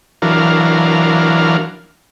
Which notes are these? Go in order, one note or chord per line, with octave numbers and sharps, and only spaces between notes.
E3 F#3 D4 A#4 F5